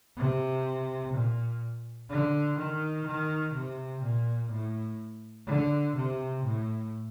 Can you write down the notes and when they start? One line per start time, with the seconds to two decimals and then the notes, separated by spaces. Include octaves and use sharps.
0.17 C3
1.13 A#2
2.09 D3
2.58 D#3
3.05 D#3
3.54 C3
4.02 A#2
4.50 A2
5.47 D3
5.95 C3
6.44 A2